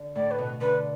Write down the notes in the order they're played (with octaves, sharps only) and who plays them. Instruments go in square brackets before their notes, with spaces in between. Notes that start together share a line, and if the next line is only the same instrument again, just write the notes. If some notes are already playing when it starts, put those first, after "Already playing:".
Already playing: [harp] D3
[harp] A2 [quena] D5
[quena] B4
[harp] B2
B2
[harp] D3 [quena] B4